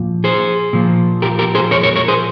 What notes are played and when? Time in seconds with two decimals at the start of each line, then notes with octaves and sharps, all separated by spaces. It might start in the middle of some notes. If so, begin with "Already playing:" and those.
Already playing: A#2 F3
0.24 G#4 C5
0.73 A#2 F3
1.22 G4 A#4
1.39 G4 A#4
1.55 G#4 C5
1.71 A#4 C#5
1.83 A#4 C#5
1.96 A#4 C#5
2.08 G#4 C5